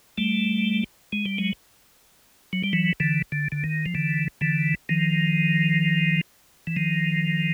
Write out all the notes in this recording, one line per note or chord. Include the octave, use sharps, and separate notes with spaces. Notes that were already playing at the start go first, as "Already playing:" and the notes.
G3 A3
G#3
G3
F#3 G#3
F#3
G3
E3 F#3
D3 E3
D3
D3
D#3
F3
D3 E3
D3 E3
D#3 F3
E3
D#3 F3